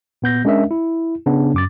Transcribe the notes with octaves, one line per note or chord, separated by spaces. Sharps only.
A#2 B3 G6 A#6
G#3 C#4 D4 A#4 D#5 E5
E4
C#3 B3 D4
F#2 D6 A6